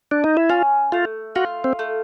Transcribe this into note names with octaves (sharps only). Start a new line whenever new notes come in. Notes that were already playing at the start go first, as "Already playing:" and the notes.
D4
D#4
E4
C#4 F4
A3 F4
F4 F#4
C4
A3